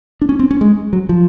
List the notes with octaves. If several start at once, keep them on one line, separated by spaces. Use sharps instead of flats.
D4
C#4
C4
C#4
G#3
F#3
F3